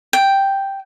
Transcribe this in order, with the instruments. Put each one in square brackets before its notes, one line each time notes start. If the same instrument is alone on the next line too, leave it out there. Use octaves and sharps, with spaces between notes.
[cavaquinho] G5